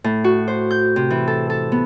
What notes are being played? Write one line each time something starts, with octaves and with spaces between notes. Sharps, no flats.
A2
F#4
C5
G6
C3
E3
A4
A4
B3